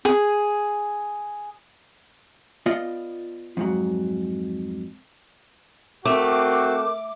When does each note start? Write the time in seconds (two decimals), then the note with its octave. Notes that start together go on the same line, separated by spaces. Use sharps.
0.05 G#4
2.66 B3 F4 D5 D#5
3.57 F2 G#2 F#3
6.05 A3 C4 F#4 A#4 D6